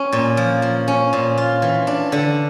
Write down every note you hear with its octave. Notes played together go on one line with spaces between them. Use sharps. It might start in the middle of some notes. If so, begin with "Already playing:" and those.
Already playing: C#4
A#2
F3
F3
C#4
A#2
F4
E3
D4
D3